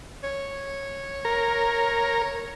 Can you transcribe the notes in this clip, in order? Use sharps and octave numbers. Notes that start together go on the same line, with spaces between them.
C#5
A#4